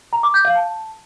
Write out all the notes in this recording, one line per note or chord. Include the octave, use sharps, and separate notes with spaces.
A#5
D6
G6
F5
A5